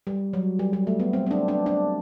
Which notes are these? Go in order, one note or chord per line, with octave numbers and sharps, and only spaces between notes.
G3
F#3
G3
G3
A3
B3
C4
C4
D4
D4
D4